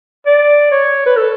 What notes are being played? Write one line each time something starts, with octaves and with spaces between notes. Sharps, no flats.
D5
C#5
B4
A4